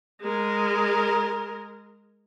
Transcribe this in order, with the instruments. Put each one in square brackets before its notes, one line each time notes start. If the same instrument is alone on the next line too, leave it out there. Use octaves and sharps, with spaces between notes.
[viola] G#3 A#4